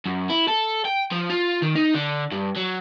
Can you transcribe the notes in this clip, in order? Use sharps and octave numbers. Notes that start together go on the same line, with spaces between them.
F#2
E4
A4
G5
F3
F4
D#3
D#4
D3
G2
F#3